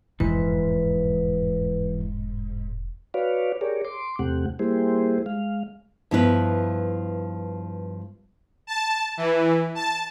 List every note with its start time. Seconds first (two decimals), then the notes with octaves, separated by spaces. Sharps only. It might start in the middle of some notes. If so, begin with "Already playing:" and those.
0.20 E1 F2 G#2 E3 B4
3.14 F#4 B4 C#5 D5 F5
3.61 G4 G#4 A#4 C#5 D5
3.85 C6 D6
4.19 E2 C3 A3 C4 G4 F#5
4.59 G3 A#3 E4 G4 G#4 C5
5.26 G#3 F5
6.11 G2 F3 B3 E4 G4 B4
8.67 A5
9.17 E3
9.75 A5